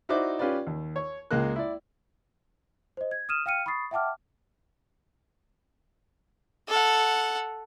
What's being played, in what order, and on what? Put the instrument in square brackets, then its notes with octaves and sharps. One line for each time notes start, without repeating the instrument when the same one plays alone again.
[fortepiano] D#4 E4 F#4 C5 D5 D6
C#4 F4 G4 B4 D5
D#2
C#5
C#2 G#3 A#3 F#6
E4 D5
[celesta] C5 D#5
G#6
D#6 F6 D#7 E7
F5 G5 F6 C#7 D#7
B5 C#6 D#6 A6 C7
E5 F#5 G5 A5 D6 F6
[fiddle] A4 F#5